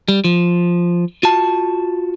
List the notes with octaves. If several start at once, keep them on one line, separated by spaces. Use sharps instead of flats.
G3
F3
F4 F#4 A5